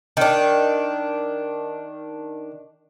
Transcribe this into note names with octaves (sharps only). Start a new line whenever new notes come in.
D#3 D4